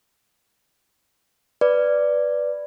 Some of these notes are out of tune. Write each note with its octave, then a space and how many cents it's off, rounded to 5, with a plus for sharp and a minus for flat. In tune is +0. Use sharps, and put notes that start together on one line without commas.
B4 +0 D5 +0